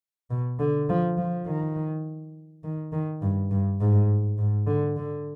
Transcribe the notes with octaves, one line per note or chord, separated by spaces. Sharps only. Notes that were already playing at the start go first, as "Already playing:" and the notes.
B2
D3
F3
F3
D#3
D#3
D#3
G2
G2
G#2
G#2
D3
D3